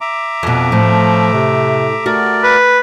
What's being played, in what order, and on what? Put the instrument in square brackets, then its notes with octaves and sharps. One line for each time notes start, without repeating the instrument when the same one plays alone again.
[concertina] E5 A#5 D6
[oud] F2 B2
[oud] A2 [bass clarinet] F3
[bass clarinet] C3
[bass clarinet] A3 [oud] F#4 [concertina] A#4 D5
[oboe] B4